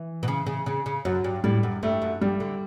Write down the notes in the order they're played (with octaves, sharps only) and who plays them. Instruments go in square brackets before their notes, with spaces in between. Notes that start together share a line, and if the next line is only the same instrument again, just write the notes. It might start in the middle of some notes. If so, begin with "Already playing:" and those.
Already playing: [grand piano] E3
[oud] B2
C#3
C#3
C#3
C#3
[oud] F#2 [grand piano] F#3
[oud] G2
[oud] A2 [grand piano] G3
[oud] F#2
[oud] G2 [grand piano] A3
[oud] F#2
[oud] G2 [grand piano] G3
[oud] D3